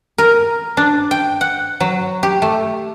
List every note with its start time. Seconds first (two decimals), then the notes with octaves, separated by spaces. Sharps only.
0.18 A#4
0.77 D4
1.11 G5
1.41 F#5
1.80 F#3
2.23 G4
2.42 A3